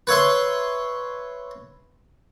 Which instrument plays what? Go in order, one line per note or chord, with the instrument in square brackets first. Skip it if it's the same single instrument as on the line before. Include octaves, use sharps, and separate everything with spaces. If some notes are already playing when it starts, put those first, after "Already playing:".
[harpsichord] B4 C#5 E5 C6